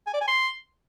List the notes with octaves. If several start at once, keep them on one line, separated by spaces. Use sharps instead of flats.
G#5
D5
G#5
C6